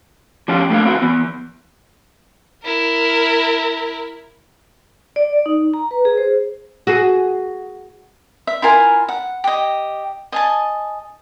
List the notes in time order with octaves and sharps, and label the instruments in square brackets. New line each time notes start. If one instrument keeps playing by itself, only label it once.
[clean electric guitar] F3 C#4 D4 F4 G4
A3 A#3 C4 D4 F5
C4 E4 F#4
E3 B3
[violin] E4 A#4
[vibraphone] D5
D#4
A#5
B4
G#4
C5
[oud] F#4 G#4
[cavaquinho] E5
E4 F4 A#4 G#5
F#5
G4 D#5
D#5 G#5 A5